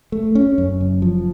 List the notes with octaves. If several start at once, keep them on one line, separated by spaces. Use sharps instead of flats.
A3
C#4
F#2
F#1
F3